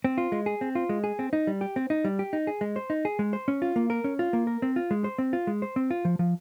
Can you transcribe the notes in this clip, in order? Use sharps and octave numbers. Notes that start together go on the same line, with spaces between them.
C4
F4
G#3
G#4
C4
F4
G#3
G#4
C4
D#4
G3
G4
C4
D#4
G3
G4
D#4
G#4
G#3
C5
D#4
G#4
G#3
C5
C#4
F4
A#3
A#4
C#4
F4
A#3
A#4
C4
F4
G#3
C5
C4
F4
G#3
C5
C4
F4
F3
F3